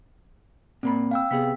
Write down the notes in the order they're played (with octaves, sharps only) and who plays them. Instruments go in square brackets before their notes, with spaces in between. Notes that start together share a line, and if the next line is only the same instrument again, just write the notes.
[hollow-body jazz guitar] A#2 A#3 B5 [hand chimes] C4
[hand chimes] F5 G5 E6
[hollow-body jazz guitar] C3 B3 G#4 [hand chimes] B6